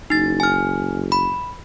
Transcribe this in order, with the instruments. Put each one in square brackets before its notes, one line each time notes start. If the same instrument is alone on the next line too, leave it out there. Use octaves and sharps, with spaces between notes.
[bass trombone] F#1 [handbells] D#4 A6
[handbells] G#5 F6
B5